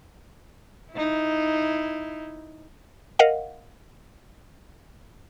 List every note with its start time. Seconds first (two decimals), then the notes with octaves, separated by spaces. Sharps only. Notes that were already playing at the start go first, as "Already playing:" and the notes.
0.93 D#4 E4
3.19 A#4 D#5 F5 F#5